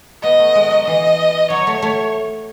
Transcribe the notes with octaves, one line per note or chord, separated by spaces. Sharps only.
B3 D#5
A3
G#3
F#3
E3 D#5
F#3 C#5
A3
A3